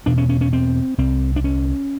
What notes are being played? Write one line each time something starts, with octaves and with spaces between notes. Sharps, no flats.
E2 B2 D4
C#4
C#4
C#4
C4
C2 C3 C4
D4
C#4